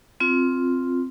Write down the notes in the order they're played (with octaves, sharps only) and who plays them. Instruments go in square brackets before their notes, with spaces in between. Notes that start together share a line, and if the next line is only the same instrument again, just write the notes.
[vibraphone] C4 F4